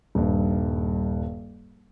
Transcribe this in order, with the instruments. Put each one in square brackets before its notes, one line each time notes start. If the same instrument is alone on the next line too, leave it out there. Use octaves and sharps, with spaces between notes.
[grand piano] D#1 G2